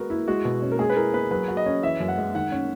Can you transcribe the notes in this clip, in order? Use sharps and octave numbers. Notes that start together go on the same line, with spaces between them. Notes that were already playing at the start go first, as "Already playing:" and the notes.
Already playing: G#3 B3 F#4 A#4
E4
G#3 F#4
B2
C#4
A#4
G#3 G#4
B4
E4 A#4
B3 B4
F#3 B4
F#4
D#5
C#4
E3 E5
F#2
F#5
G#3
D#3 F#5
C#4